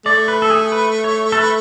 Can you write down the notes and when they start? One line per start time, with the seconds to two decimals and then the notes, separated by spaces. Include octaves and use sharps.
0.05 A3 D5
0.28 B4
0.42 A4
0.50 G#4
0.72 B4
1.04 C#5
1.32 A4
1.37 B4